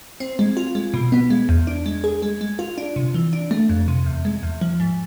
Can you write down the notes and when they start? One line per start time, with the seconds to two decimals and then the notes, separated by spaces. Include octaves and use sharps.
0.20 C4
0.39 G#3
0.57 F4
0.75 G#3
0.94 B2
1.12 B3
1.30 G#3
1.49 E2
1.67 D4
1.86 G#3
2.04 G#4
2.22 G#3
2.41 G#3
2.59 F4
2.78 D4
2.96 C3
3.14 E3
3.33 D4
3.51 A3
3.69 F2
3.88 C3
4.06 E2
4.25 G#3
4.43 E2
4.61 F3
4.80 G#2